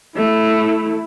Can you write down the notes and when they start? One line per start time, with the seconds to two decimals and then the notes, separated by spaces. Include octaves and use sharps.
0.16 A3 E4